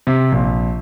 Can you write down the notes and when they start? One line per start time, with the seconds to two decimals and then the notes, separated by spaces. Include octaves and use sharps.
0.07 C3
0.32 A#1